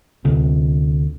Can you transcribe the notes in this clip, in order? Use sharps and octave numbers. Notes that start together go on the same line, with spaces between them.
D2 C3